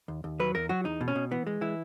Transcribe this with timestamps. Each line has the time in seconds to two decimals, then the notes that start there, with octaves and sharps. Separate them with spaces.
0.08 D#2
0.24 D#2
0.40 F#3 B4
0.55 E2 A#4
0.69 F#3 F#4
0.85 E2 D#4
1.01 B2
1.08 C#4
1.15 B2
1.31 E3 B3
1.47 G#3
1.61 E3 E4